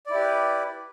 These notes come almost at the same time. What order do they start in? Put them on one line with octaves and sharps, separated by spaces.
D5 E4 G4 B4